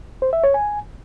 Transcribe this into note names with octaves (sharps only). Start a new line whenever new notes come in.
C5
E5
C#5
G#5